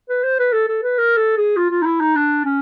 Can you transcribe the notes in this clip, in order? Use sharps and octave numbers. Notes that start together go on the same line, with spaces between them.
B4
C5
B4
A4
A4
B4
A#4
A4
G#4
F4
F4
D#4
E4
D#4
D4
C#4